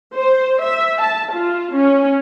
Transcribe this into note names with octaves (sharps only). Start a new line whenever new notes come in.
C5
E5
A5
F4
C#4